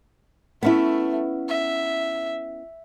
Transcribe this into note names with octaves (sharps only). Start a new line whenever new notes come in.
A3 B3 C#4 E4
E5